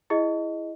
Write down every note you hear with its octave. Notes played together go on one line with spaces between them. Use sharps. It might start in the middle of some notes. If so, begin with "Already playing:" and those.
E4 G#4 D#5